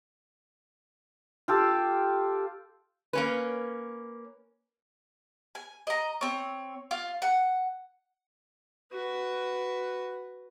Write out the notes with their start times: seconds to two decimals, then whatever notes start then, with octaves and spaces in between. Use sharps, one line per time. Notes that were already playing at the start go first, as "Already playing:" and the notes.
1.48 F4 G4 A4
3.13 A#3 C#4 B4
5.55 G#5
5.87 D#5 A#5
6.21 C4 C#5
6.91 F4
7.22 F#5
8.93 F#4 B4